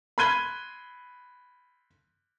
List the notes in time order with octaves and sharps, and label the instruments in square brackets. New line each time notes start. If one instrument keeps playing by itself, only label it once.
[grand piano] B5 C6 F#6 G#6 D#7 G7